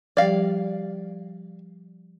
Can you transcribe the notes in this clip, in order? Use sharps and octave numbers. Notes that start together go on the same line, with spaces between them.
F3 G3 G4 D5 F5